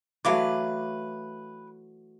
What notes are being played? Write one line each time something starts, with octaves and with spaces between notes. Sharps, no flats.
E3 F#3 A3 B4 F5 D6